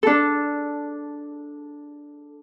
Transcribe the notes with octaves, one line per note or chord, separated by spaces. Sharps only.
D4 A4